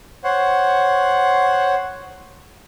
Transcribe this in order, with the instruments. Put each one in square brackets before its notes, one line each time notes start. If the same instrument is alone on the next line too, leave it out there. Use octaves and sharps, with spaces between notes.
[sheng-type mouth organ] C5 C#5 F#5